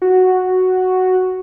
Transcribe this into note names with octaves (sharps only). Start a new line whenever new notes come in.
F#4